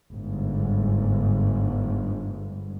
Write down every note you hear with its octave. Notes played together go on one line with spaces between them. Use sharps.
G1 G#2